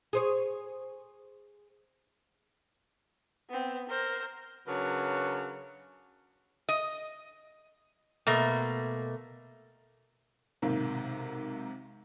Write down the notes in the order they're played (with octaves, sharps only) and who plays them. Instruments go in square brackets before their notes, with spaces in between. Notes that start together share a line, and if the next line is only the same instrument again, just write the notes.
[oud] G#4 C5 C#5
[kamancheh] B3 C4
A#4 C5
[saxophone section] C#3 F#3 D4 A#4 B4 C#5
[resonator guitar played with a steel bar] D#5
B2 A3 A#3
[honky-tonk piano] B1 G#2 C3 D#3 A#3